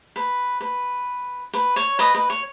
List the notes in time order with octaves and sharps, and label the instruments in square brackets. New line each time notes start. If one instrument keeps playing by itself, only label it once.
[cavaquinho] B4
B4
B4
C#5
B4 D#5
B4
C#5